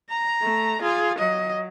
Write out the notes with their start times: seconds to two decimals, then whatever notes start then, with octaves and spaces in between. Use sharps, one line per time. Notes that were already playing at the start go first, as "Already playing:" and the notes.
0.10 A#5
0.41 A3
0.82 F4 G#4
1.19 F#3 D#5